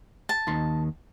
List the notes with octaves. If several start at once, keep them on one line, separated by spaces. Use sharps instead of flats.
A5
D#2 D#3 C6